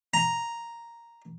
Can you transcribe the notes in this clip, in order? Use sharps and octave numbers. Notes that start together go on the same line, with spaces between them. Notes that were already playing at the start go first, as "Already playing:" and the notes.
A#5